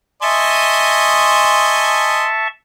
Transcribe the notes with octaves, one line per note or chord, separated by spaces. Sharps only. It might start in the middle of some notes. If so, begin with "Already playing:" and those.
D#5 E5 G#5 A5 C6 C#6